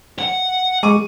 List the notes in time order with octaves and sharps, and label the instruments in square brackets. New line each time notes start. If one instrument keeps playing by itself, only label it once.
[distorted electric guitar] F#5
[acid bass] G#3 [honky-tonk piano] C#6 D6 D#7